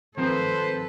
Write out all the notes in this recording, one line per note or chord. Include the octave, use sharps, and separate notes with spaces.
D#3 F3 C4 A4 B4 C5